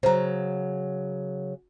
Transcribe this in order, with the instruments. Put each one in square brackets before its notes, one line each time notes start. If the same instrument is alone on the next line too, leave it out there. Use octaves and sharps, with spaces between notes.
[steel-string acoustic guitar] C#3 F#3 [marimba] C5 A#5